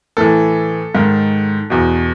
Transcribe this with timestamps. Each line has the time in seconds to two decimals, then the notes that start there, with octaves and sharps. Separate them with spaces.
0.17 A2 E3 A4
0.94 G#2 D#3
1.70 E2 B2